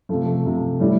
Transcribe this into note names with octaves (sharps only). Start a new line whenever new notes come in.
C3 F3 A3
A3
C3 F3
A2 E3 G3